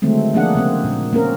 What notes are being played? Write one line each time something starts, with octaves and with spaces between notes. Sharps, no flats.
D3 D#3 F#3 G#3 A3 C4
F3 A#3 D4 G#4 F#5
C#3 A#3 C4
A#2
A#3 C4 C#4 A#4